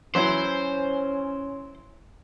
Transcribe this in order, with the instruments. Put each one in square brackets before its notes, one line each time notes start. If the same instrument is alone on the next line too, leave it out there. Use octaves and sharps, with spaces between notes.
[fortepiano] E3 F#3 E4 [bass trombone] C#4 [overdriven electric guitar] C5